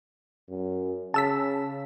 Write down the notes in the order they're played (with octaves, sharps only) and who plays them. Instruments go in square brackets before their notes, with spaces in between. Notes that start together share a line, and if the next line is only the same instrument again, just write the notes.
[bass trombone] F#2
[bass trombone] C#3 [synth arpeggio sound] A5 E6 B6